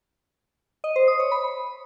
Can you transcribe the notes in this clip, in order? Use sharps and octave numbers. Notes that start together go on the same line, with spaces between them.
D#5
C5
D#6
C#5
B5